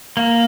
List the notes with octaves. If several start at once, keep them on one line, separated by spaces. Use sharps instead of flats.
A#3